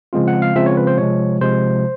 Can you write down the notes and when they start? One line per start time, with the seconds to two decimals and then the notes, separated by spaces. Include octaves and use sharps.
0.13 C#3 F3 G#3 C4 F4
0.28 F#5
0.42 F5
0.55 C#3 F3 G#3 C4 F4 E5
0.66 C#5
0.77 B4
0.87 C5
0.98 C3 F3 G#3 C#5
1.41 C3 F3 G#3 C5